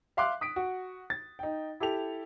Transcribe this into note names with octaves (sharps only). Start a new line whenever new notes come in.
E5 F5 C6 D6 F#6
D#6 B6 D7
F#4
A6
D#4 G5
E4 G4 A4 F7